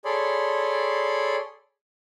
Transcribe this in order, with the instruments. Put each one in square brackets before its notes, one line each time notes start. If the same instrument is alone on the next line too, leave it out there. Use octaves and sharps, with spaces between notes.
[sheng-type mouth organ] G#4 A4 C#5 D5 B5 C6